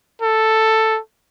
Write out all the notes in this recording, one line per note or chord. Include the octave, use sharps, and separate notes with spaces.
A4